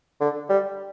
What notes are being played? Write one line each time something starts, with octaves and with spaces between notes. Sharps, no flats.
D3
G3